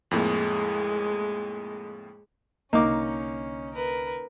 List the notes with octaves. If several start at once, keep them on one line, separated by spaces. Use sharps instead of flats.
F2 A2 G#3 A#3
C2 D3 A#3 C#4 D#4 D6
A#4 B4